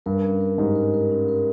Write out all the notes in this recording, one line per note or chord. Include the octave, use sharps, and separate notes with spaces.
G2 A#4
C#4
A#4
G#2 G4
A#4
A#4
C#4
A#4